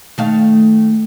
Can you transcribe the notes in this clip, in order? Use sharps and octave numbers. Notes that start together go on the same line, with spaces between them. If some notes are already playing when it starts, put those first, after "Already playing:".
D#3 A3 F5